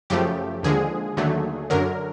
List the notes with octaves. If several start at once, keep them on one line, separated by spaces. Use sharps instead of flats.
F#2 C#3 F3 A3 G4
D#2 D3 F3 G#3 G#4
D#2 D3 F#3 A3
F#2 D3 F#3 A#4